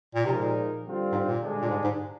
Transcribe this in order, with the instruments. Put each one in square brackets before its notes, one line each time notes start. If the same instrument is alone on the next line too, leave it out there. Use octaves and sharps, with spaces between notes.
[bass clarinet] A#2
[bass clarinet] C3 [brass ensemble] F3 G#3 D#4 A#4
[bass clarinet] A#2
[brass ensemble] D3 G3 C4 F4
[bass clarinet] G#2
A#2
[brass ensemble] G2 D3 G#3 D4
[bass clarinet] A#2
G#2
G#2